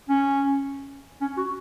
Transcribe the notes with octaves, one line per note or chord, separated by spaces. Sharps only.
C#4
C#4
F#4